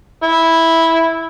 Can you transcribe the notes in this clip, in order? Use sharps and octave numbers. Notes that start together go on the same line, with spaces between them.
E4